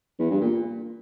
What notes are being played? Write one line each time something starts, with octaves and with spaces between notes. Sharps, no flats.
E2
G2
A#2